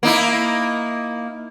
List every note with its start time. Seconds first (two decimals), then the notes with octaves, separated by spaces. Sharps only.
0.03 A#3 D#4 E4